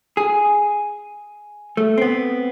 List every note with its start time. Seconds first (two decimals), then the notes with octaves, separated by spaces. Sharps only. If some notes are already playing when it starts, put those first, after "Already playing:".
0.17 G#4
1.77 A3
1.98 B3 C4